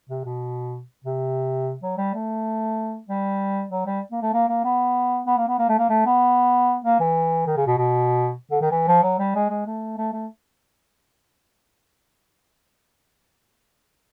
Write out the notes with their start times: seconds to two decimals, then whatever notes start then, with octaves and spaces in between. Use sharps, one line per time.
0.10 C3
0.26 B2
1.05 C3
1.83 F#3
1.98 G3
2.14 A3
3.08 G3
3.71 F#3
3.86 G3
4.12 A#3
4.22 A3
4.34 A#3
4.48 A#3
4.65 B3
5.27 B3
5.38 A#3
5.48 B3
5.59 A#3
5.69 A3
5.79 A#3
5.90 A3
6.06 B3
6.84 A#3
7.00 E3
7.47 D#3
7.57 C#3
7.67 B2
7.77 B2
8.51 D3
8.62 D#3
8.72 E3
8.88 F3
9.03 F#3
9.19 G3
9.35 G#3
9.50 G#3
9.66 A3
9.98 A3
10.13 A3